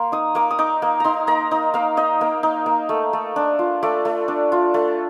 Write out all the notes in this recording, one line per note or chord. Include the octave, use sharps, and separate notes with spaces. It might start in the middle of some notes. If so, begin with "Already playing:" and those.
Already playing: A#3 C6
D#4 D#6
A#3 D6
D#6
D#4 D6
A#3
D#4 A#5 C6
A#3 A#5
D#4
A#3 F5
D#4 D#5
A#3
D#4
A#3
A3
A3
D4
F4
A3 D5
A3
D4
F4
A3